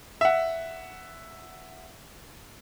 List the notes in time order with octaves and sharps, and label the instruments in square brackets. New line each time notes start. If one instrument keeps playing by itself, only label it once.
[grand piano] E5 F#5